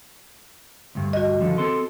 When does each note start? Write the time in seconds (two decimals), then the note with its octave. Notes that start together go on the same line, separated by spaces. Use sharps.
0.95 D2 G2
1.13 F#4 D#5
1.41 D3 D#3 F3
1.58 C4 A4 C6